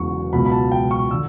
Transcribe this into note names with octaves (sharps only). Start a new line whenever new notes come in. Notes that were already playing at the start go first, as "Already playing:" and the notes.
Already playing: E1 E2 C#3 F#3 C#6
C#2 B2 F#3 B5
B5
A5
G5
C#6
D3 E6